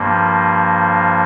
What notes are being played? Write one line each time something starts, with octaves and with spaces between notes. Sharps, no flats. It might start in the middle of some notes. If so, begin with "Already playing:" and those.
Already playing: G2 F3 A#3